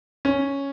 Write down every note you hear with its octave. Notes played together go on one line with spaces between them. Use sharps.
C#4